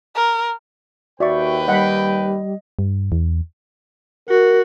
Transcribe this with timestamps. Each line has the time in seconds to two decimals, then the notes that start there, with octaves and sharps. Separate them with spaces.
0.16 A#4
1.20 D#2 F#4 B4 D5 E5 G5 C#6
1.68 G3 D#5 F#5 B5
2.79 G2
3.12 E2
4.29 F#4 A#4